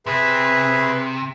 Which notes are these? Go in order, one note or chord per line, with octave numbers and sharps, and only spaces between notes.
C3 G#4 B4 E5